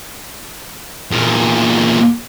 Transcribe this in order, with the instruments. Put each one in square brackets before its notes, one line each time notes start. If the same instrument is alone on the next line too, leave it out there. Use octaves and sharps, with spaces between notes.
[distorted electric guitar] E2 A#2